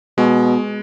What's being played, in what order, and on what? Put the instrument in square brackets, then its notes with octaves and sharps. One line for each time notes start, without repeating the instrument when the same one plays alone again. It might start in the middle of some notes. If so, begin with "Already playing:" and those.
[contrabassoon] B2 [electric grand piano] G#3